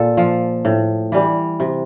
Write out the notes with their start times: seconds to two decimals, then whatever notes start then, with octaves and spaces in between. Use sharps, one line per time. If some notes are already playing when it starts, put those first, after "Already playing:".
Already playing: A#2 A4
0.17 F3
0.65 A2
1.12 E3 G3
1.60 C3